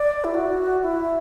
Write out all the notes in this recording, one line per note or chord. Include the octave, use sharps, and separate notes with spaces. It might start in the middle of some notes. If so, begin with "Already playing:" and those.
Already playing: D5
E4
F#4
E4